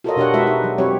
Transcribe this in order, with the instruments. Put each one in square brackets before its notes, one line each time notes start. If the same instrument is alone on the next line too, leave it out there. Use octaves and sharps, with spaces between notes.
[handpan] F4 F#4 A4 A#4 C#5 D#5
B2 D4 G4 C#5 F#5
G#3 F#4 G4 B4 E5
D#4
F#3
F#3 C4 G4 B4 C#5